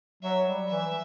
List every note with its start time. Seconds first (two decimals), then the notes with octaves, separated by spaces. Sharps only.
0.23 F#3 E5
0.46 G3
0.69 E3 E5